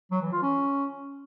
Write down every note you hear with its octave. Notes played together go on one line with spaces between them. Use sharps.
F#3
E3
F4
C#4